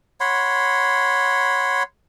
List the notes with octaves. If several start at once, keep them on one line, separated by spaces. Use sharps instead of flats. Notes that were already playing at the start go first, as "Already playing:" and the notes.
C#5 F#5 B5 C6